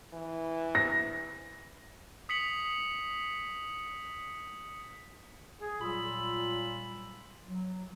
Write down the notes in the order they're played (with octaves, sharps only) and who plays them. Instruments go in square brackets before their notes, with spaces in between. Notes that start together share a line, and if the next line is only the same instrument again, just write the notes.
[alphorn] E3
[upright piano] A#6
[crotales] D#6 B6 C#7 F#7
[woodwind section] G#4
A#2 F#3 G3 F4 B5 E6
F#3